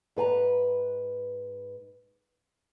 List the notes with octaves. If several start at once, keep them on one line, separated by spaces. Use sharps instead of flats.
G#2 B4 G#5 A#5